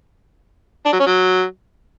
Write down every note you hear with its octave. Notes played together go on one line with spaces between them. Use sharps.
D4
F#3
C#4
F#3